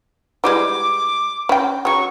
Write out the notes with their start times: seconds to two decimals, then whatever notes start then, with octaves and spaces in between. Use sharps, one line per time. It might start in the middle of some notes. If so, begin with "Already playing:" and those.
0.44 E3 G3 G#3 D6
1.49 C#4 G5
1.85 C#3 F#3 C#6